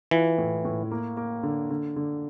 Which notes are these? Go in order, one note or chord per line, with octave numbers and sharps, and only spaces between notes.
E3 F4
A2
A2
A#3
A#3
D3
D3
D3